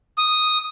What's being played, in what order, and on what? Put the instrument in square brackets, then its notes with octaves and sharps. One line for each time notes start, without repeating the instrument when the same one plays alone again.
[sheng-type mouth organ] D#6